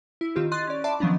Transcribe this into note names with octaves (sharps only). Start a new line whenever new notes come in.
E4
D#3 C4 F4 G4
D#5 C6 F#6 A6
C#4 D5
D5 E5 A5 B5 C6 D6
D#3 F3 F#3 B3 C#4 D4